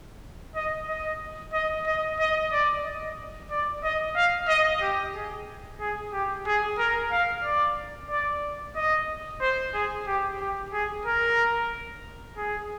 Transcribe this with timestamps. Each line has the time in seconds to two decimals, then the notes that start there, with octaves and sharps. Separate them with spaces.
0.56 D#5
0.88 D#5
1.53 D#5
1.86 D#5
2.20 D#5
2.53 D5
2.85 D#5
3.51 D5
3.83 D#5
4.16 F5
4.48 D#5
4.82 G4
5.15 G#4
5.81 G#4
6.13 G4
6.47 G#4
6.78 A#4
7.12 F5
7.44 D5
8.10 D5
8.76 D#5
9.41 C5
9.74 G#4
10.07 G4
10.41 G4
10.73 G#4
11.06 A#4
12.37 G#4